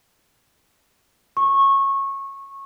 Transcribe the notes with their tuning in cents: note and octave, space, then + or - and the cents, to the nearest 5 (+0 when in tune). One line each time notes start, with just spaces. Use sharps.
C#6 -20